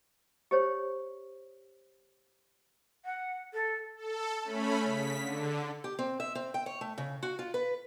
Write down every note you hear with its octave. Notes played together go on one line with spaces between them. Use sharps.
G4 C5 C#5
F#5
A4
A4
A3 C#4 B5
C#3 B6
D3
G4
C4
E5
C4
G5
C#5
A3
C#3
F#4
F4
B4